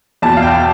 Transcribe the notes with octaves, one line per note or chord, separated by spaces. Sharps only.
E2 B2 A5
F5
G5